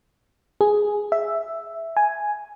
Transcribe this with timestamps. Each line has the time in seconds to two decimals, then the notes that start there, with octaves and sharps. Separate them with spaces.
0.61 G#4
1.12 E5
1.97 G#5